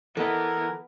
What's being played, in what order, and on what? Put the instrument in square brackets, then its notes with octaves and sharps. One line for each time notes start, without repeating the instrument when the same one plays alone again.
[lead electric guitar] E3 [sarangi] B3 [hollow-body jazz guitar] A4 D#5 [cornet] A#4